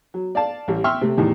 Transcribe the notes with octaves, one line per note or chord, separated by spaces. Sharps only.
F#3
D5 F5 A5
A1 G3
E5 G5 C6 C#6 E6 F6
C3 A3
E2 A2 D#3 G3